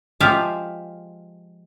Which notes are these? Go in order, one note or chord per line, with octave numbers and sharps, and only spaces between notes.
F3 G#3 F4 G4 E5 F5